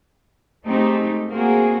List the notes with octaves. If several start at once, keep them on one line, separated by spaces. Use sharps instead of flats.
G#3 A3 C4 D#4 G4 A4
A#3 C4 F#4 G#4